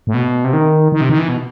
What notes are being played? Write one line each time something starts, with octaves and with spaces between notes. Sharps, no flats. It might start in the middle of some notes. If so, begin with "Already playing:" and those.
A2
B2
C3
D#3
D#3
C3
D#3
E3
B2